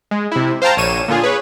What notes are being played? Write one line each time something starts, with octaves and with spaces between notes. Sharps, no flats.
G#3
C3 E4
C5 F5 G5 A5 A#5
A#1 C#5 D#7 E7
A#2 D3 F4 G#4
G#4 B4 C#5